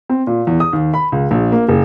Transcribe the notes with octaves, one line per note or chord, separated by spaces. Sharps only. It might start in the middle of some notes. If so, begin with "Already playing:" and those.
C4
A#2
E2
D#6
D#2
B5
C#2
A#1
A#3
F#1